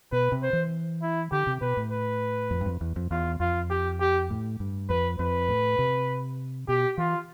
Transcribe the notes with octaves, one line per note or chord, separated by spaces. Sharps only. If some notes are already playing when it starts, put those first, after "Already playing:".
B2 B4
C3
C5
E3
E4
D3 G4
C3
B2 B4
A2
B4
F2
G2
F2
E2
F2
E2 F4
F2 F4
G4
G4
A2
G2
F2 B4
F2 B4
A2
C3
B2 G4
E3 F4